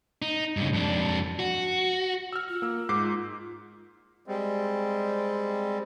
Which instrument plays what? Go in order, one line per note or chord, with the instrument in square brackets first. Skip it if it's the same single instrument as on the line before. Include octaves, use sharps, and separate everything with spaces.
[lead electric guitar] D#4
G2 C#3
F2 D4
F#4
[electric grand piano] E6 F6
[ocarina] F4
[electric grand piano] A#3 E6
G#2 D6 C7
[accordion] G3 G#3 C4